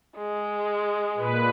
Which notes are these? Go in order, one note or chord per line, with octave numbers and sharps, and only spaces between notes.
G#3
A#2 B4